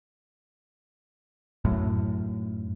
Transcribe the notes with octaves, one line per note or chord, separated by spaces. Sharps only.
F#2 A2